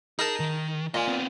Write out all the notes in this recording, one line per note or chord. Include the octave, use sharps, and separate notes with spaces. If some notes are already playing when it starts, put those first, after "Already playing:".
D#4 G#4 A#4 A5
D#3
A#2 D#5 G#5
B3 C4